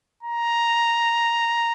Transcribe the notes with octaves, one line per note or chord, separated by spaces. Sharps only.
A#5